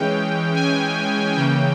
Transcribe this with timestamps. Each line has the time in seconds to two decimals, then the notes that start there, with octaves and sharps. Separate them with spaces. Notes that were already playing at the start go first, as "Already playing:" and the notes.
Already playing: E3 G#3 C#4 G5
0.54 G#5
1.34 C#3 E3 A#3 C#4 G5